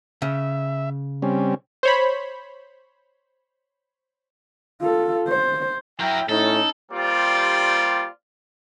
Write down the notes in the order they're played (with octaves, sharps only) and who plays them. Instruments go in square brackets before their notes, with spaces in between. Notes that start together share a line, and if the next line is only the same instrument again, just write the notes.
[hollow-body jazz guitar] C#3 [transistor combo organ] E5
[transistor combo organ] G3 C4 C#4
[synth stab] C5 C#5 B5
[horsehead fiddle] F4 A4
C5
[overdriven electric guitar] F#3 A#4 [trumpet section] E4 E5 G5
[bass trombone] A2 [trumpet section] C#4 D#4 [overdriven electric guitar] A4
[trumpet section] G3 A#3 C4 F4 G4 D5